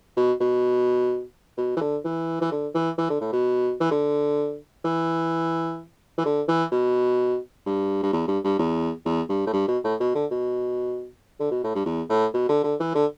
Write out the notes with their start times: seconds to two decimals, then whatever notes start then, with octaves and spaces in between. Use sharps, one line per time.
0.16 B2
0.40 B2
1.57 B2
1.76 E3
1.81 D3
2.04 E3
2.41 E3
2.51 D3
2.74 E3
2.98 E3
3.10 D3
3.21 A2
3.33 B2
3.80 E3
3.91 D3
4.84 E3
6.18 E3
6.25 D3
6.48 E3
6.72 B2
7.66 G2
8.03 G2
8.12 E2
8.27 G2
8.44 G2
8.59 E2
9.05 E2
9.29 G2
9.46 A2
9.53 G2
9.68 B2
9.84 A2
10.00 B2
10.15 D3
10.30 B2
11.40 D3
11.51 B2
11.63 A2
11.75 G2
11.86 E2
12.09 A2
12.34 B2
12.49 D3
12.64 D3
12.80 E3
12.95 D3